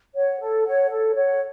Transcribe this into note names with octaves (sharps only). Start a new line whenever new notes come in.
C#5 F#5
A4
C#5 F#5
A4
C#5 F#5